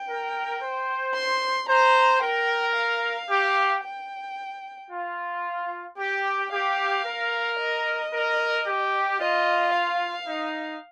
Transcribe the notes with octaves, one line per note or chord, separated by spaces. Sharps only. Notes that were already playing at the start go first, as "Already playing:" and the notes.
Already playing: G5
A#4
C5
C6
C5 A#5
A#4 G5
F5
G4
G5
F4
G4 G5
G4 F5
A#4
D#5
A#4
G4
F4 D#5
F5
D#4